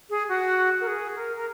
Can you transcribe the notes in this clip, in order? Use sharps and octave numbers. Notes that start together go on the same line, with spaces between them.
G#4
F#4
A#4
G#4
A#4
A#4